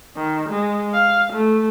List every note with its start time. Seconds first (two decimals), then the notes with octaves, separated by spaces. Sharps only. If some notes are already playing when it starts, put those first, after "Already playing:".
0.16 D#3
0.49 G#3
0.93 F5
1.33 A3